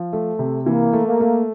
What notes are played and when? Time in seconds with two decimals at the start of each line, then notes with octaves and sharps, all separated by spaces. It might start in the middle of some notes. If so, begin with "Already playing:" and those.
Already playing: F3
0.13 A3
0.39 C3
0.66 E3 A#3
0.93 A3
1.07 A#3
1.20 A3